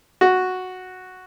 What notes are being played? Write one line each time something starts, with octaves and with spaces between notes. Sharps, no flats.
F#4